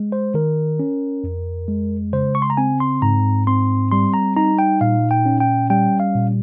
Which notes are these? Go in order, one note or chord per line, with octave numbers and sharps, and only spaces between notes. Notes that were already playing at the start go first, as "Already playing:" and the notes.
Already playing: G#3
C5
D#3 A#4
C#4
F2
G#3
C#3 C5
C#6
C6
A#5
C4 G#5
C6
G#2 A#5
C4 C6
G3 C6
A#5
D#4 A#5
G5
A#2 F5
G5
C#4
G5
G3 G5
F5
A#2